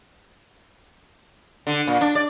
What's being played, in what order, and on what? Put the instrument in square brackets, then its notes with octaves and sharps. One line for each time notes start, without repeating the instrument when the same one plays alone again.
[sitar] D3
A#2
D4
D5